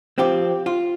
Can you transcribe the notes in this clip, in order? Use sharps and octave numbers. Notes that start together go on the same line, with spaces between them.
F3 C4 G4
F4